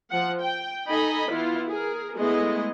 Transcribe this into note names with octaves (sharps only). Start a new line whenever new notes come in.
F3 F#5
G5
D#4 A4 D#5 G#5 B5
E3 B3 E4 F4
G#4 A#4
G#3 A3 B3 E4 G#4 D#5